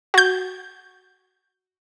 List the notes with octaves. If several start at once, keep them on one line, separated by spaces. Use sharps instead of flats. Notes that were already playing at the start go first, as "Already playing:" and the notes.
F#4 G6